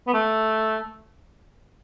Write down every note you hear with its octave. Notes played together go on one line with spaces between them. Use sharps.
B3
A3